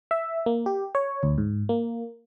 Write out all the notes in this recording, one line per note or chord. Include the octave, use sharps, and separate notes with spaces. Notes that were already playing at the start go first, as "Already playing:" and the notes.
E5
A#3
G4
C#5
D2
G#2
A#3